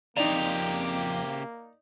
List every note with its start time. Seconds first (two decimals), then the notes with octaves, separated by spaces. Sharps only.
0.17 F2 C#3 A#3 C4 D#4 G4 D5 A#5